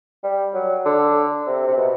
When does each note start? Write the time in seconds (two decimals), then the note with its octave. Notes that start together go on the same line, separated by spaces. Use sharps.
0.23 G3
0.54 F#3
0.85 D3
1.47 C3
1.67 C3
1.77 B2